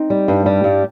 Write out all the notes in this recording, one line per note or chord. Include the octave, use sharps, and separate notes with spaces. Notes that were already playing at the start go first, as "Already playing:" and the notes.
Already playing: C4 D#4
G3
G2
G3
G2